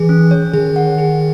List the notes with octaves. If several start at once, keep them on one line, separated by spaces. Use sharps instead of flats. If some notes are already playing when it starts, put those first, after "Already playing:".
Already playing: E3 G#4
C#4
C#5
D#3 G#4
F#5
G#4